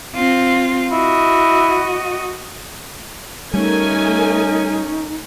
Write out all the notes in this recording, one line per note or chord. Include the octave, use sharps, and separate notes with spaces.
C4 F4
E4 F#4 D#5
G3 A3 C#4 D#4 A#4 G#5